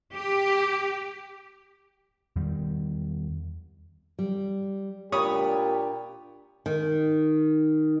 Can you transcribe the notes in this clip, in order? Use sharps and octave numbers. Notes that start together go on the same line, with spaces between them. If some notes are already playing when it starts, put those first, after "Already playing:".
G4
E2 D#3 G3
G3
A#2 D4 G4 C#5 B5 D#6
D#3